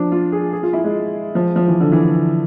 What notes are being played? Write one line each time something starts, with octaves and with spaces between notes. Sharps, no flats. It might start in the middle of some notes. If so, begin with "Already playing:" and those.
Already playing: F3 D4
F4
G#4
G#4
F4
E4
G#3
F3
F3
E3
D3
E3